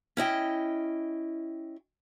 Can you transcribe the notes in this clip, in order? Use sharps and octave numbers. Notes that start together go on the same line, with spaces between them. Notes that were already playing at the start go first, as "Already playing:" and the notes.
C#4 E4 D#5 G5